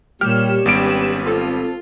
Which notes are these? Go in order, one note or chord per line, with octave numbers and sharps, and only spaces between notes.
A#2 G3 G4 C#5 F6 E7
G#1 G3 B3 C#4 B4 D7
C4 F4 A4